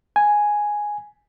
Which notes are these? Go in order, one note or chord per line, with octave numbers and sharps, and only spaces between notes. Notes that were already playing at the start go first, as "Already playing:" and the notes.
G#5